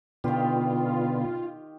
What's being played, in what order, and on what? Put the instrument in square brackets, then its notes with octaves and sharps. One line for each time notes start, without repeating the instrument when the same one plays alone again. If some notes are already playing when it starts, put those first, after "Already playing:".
[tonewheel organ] B2 D3 B3 [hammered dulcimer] D#3 G4 [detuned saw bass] F4